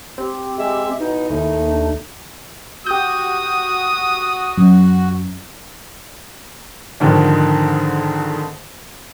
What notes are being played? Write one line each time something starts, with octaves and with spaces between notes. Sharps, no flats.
C4 G4
G#3 E5
B2 D#4 E4
D#2 A3
D4
F#4 G4 D#6 G6
F#2
F2 G#2 D3 D#3 F3